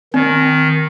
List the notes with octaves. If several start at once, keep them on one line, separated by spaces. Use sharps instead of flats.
D#3 C4